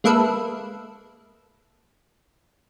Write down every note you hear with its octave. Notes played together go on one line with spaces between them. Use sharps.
G#3 A#3 A4 B4 E5